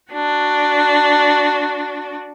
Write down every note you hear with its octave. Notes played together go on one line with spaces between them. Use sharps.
D4 F#4